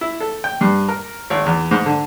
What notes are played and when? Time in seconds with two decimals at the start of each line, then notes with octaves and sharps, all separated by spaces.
0.01 E4
0.20 A4
0.44 G5
0.61 G2
0.89 A#4
1.30 G#1
1.46 E2
1.71 G#2
1.86 D3